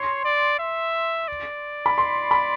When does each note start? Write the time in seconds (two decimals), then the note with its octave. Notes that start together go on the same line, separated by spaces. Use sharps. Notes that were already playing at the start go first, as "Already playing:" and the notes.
Already playing: C#5 C6
0.25 D5
0.59 E5
1.28 D5
1.86 B5
1.98 C6
2.31 B5